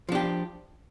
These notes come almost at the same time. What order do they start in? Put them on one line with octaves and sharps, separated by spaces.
F3 D4 G4